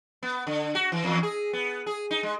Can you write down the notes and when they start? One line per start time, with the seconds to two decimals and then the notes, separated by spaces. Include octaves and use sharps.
0.23 B3
0.47 D3
0.75 F#4
0.92 E3
1.04 E2
1.23 G#4
1.53 B3
1.86 G#4
2.11 D#4
2.23 G#3